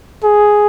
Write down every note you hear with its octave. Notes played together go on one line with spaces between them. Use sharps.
G#4